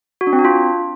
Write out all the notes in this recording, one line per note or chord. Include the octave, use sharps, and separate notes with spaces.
F#4
D4
C4
D4
F4